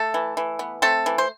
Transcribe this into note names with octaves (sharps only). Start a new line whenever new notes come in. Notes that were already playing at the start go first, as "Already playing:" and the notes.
Already playing: A3 A4
E3
E3
B3
A3 C4 A4
E3
C5